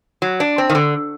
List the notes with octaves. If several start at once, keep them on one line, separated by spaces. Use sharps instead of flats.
F#3
D4
C4
D#3
D3